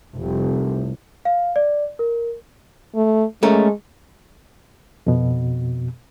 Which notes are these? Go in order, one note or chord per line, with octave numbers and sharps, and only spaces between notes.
F1 C2
F5
D5
A#4
A3
G#3 A3 C#4 A#4
F2 B2